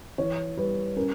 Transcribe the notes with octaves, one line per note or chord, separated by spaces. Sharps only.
E3 C#5
G3 B4
C#4 A#4